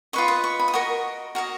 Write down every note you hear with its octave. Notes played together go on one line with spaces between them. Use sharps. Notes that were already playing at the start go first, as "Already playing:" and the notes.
F4 B4 D#5 C#6
D#6
C#6
B5
D#6
F#4 A#4 D#5 C#6
F#4 A#4 D#5